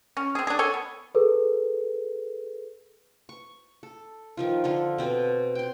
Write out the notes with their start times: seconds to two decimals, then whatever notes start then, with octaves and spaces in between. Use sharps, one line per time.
0.17 C#4
0.35 C4 G#4
0.47 D4 G#4
0.59 A4 C#5 G#5
0.74 B3
1.15 G#4 A4 B4
3.29 C#6
3.83 A4
4.37 D#3 F3 F4
4.64 D3 F4 A4
4.98 B2 C4 B4
5.55 G5 C6